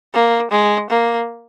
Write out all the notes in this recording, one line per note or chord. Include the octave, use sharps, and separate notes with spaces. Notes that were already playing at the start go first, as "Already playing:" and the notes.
A#3
G#3
A#3